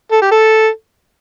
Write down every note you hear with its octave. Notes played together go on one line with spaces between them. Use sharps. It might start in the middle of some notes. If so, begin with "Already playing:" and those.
A4
G4
A4